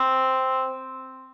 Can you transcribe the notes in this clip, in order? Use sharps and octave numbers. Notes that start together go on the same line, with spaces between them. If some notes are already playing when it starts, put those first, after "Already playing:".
Already playing: C4